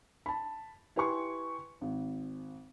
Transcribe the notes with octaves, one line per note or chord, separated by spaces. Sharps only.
A5 B5
E4 G4 B4 G#5 C6 C#6
G#1